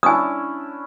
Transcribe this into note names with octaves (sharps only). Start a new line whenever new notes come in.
C#4 D4 E4 G#5 D#6